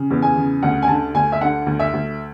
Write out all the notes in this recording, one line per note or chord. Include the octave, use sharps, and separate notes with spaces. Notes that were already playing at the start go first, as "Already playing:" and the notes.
Already playing: C#3
E2
G#5
C#3
D2 F#5
G#5
D3 A5
D2 G#5
E5
D3 F#5
D2
E5
D2